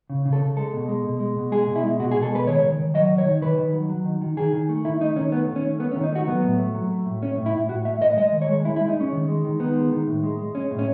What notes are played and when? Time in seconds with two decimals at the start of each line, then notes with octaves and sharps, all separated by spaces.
0.10 C#3
0.26 C#3
0.33 A4
0.41 C#3
0.56 G#3 A4
0.73 B2
0.89 G#3
1.04 B2
1.20 G#3
1.36 B2
1.52 G#3 G#4
1.67 B2
1.76 E4
1.83 G#3
1.99 B2 F#4
2.11 G#4
2.15 B2
2.23 A4
2.30 G#3 B4
2.47 D#3 C#5
2.63 D#3
2.79 D#3
2.94 F#3 D#5
3.10 D#3
3.18 C#5
3.26 D#3
3.42 D#3 B4
3.58 D#3
3.73 F#3
3.89 F#3
4.05 D#3
4.21 D#3
4.37 D#3 G#4
4.52 D#3
4.69 A3
4.85 D#3 E4
5.01 A3 D#4
5.16 D#3 C#4
5.32 A3 B3
5.48 D#3
5.56 C#4
5.64 A3
5.80 A3 B3
5.91 C#4
5.96 D#3
6.04 D#4
6.12 A3 F#4
6.28 F#3 B3
6.43 A2
6.58 A3
6.74 F#3
6.91 A3
7.06 A2
7.22 A3 C#4
7.38 A2
7.46 E4
7.54 A2
7.69 A2 F#4
7.85 A3 E5
8.01 A2 D#5
8.17 G#3 D#5
8.32 D#3
8.42 C#5
8.49 G#3
8.64 G#3 E4
8.76 E4
8.81 G#3
8.89 D#4
8.96 G#3 C#4
9.12 D#3
9.28 G#3
9.44 D#3
9.60 D#3 B3
9.76 G#3
9.92 D#3
10.07 A2
10.23 G#3
10.39 G#3
10.55 G#3 C#4
10.71 A2
10.79 C#4